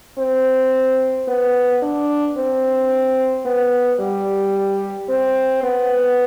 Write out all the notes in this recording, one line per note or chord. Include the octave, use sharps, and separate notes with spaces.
C4
B3
D4
C4
B3
G3
C4
B3